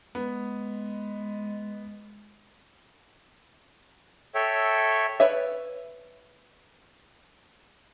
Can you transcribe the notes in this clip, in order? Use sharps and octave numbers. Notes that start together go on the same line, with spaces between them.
G#3 B3
A4 C#5 E5 G5
B4 C#5 E5